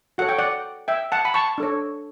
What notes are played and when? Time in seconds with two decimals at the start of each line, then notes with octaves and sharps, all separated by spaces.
0.18 F#4 A4 C#5 F#5
0.29 G5
0.39 D5 F#5
0.88 E5 G5
1.12 F#5 A5
1.25 B5
1.34 A5 C#6
1.58 D4 A4 C#5